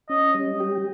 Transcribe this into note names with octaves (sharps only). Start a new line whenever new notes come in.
C#4 D#5
G3
G4